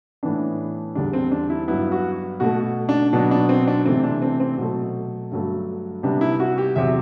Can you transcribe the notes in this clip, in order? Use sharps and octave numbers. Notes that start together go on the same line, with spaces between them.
A2 E3 B3 D4
E2 D3 G3 D4
C4
D4
E4
G2 F#3 B3 E4
F#4
B2 A3 F#4
D4
B2 F#3 B3 D4
D4
C4
D4
C3 E3 A3 C4
D4
C4
C4
B2 F#3 A3
G2 D3 F#3 A3
C3 G3 B3 D4
E4
F#4
G4
E2 C3 F#3 E5